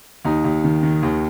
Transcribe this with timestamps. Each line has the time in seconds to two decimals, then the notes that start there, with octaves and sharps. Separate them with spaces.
0.25 D#2 D#4
0.44 D#2
0.64 D#3
0.83 D#3
1.03 D#2